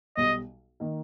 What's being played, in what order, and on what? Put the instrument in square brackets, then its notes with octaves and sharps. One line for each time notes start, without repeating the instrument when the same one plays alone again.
[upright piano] B1 B2 G3 [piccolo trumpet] D#5
[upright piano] D#3 A#3 D#4